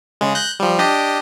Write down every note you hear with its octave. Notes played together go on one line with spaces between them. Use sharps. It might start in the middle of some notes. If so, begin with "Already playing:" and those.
C#3 G#3
F#6 G6 A#6
F3 G3
D4 G4 D#5